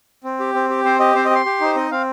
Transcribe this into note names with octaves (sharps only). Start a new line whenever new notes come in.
C4
G4
C4
G4
C4 C5
G4 D#5
C4 C5
D#5
G4 C6
G4
D#4 C5
C4 D#5
C4 F5